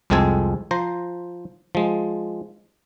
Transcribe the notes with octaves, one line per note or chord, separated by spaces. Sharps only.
C2 F2 G#3 C4 A4 G#5
F3 C5 A#5
F3 G#3